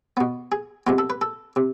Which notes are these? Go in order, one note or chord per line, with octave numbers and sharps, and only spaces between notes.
B2 B3
G#4
C3 G#3 B3 F4
A4
B4
A4
C3